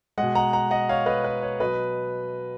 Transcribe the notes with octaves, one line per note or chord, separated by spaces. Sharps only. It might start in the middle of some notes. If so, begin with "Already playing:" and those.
B2 G#3 D#5 F#5
F#5 A#5
F#5 A#5
D#5 F#5
C#5 F5
B4 D#5
B4
C#5
B2 F#3 B4 D#5